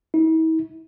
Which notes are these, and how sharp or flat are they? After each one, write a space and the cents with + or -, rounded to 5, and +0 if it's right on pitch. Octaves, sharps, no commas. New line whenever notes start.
E4 -45